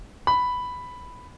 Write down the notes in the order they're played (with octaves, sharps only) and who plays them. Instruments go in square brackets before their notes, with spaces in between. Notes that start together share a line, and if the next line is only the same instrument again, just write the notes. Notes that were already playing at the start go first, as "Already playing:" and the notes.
[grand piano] B5